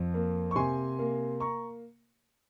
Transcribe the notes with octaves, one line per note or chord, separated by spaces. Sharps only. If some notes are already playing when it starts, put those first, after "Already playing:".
Already playing: F2
A#3
C#6
C3 G#5 C6
A#3
A#5 C#6